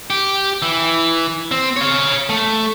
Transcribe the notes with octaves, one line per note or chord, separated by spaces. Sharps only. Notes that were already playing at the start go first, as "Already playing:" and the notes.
G4
E3
C4
C#5 F5
A3